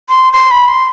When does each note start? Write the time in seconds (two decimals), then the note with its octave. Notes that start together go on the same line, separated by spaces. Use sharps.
0.09 C6
0.33 C6
0.51 B5
0.68 C6